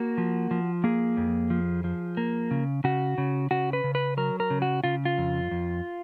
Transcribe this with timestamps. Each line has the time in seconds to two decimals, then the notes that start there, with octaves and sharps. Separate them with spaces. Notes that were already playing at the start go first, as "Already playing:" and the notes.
Already playing: A#3 F#4
0.18 F3
0.51 F3
0.84 A#3 G#4
1.17 F2
1.50 F3
1.84 F3
2.17 A#3
2.51 C#3
2.84 C#3 F#4
3.18 C#3
3.51 C#3 F#4
3.73 B4
3.84 C#3
3.95 B4
4.17 F#3 A#4
4.40 A#4
4.50 C#3
4.62 F#4
4.84 C#3 F4
5.05 F4
5.18 F2
5.51 F2